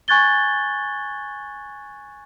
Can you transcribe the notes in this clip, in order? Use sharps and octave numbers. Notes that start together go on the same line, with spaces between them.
G#5 C#6 F#6 G#6 A6 G7